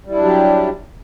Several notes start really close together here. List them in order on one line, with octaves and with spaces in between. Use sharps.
G3 E4 D4 F#3 G4